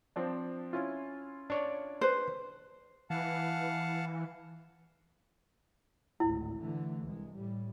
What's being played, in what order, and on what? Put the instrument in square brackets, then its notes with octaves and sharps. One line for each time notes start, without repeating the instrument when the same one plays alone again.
[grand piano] F3 C4 D4
C#4 E4 F4
[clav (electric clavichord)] D4 C#5 D5
[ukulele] B4 C5
[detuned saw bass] E3 [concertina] F5 F#5 A5
[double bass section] G#1 D2 A2 [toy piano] E4
[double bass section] D3 E3 A3
C2 G#3
A2 G3